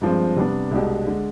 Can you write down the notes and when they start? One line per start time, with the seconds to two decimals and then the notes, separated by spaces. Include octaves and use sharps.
0.01 G2 F3 G#3 C4
0.36 C3 G3 B3 D4
0.71 C2 B2 G#3 D4 G4
1.07 D3 G#3